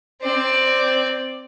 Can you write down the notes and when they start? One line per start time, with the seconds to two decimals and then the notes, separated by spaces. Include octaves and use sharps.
0.21 C4 D5